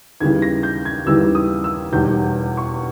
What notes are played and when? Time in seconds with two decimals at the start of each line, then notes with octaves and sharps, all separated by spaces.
0.20 D#2 C#3 E3 G3 G#6
0.42 A#6
0.63 G6
0.85 G#6
1.06 D#2 C#3 E3 G3 E6
1.35 D#6
1.64 E6
1.92 E1 E2 D#3 G3 G6
2.57 C#6